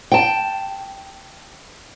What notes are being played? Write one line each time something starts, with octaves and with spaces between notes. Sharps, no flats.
G5 A5